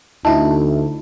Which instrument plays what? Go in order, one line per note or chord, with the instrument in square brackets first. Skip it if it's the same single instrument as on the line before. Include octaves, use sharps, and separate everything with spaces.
[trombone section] D2 [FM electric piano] D#4 E4 [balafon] A5